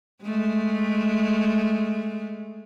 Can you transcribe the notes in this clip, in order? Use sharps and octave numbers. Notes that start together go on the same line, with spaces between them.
G#3 A3